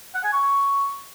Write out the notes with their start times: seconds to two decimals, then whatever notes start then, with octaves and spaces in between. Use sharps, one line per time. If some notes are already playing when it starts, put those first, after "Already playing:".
0.15 F#5
0.24 G#5
0.33 C#6